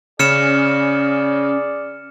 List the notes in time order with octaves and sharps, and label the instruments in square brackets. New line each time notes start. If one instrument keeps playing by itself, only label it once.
[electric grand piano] C#3 [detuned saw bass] C#4 [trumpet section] G#4 D5 [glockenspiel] F6 C#7 E7